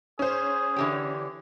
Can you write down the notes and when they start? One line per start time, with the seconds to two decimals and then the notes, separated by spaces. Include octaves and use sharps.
0.19 C#4 G#4 C5
0.76 D3 E3 G4